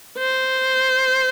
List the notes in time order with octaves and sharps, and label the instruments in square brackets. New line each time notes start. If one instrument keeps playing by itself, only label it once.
[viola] C5